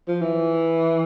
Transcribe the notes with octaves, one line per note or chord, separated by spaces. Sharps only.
F3
E3